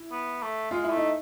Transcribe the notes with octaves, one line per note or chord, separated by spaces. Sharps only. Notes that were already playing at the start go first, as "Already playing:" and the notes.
Already playing: E4
B3
A3
G#3 F4
E4
A3
D#4